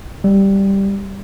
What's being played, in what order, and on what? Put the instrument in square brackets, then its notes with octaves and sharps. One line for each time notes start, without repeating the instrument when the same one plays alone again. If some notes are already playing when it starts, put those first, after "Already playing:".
[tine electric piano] G3